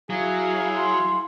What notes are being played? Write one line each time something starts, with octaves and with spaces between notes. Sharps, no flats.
F#3 E4 G#4 F5
C6